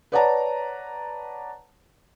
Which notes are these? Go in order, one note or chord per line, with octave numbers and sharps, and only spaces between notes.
B4 C#5 D5 F#5 A5 A#5